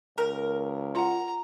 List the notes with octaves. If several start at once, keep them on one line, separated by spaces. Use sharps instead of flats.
C#2 A#4
F4 F#5 A#5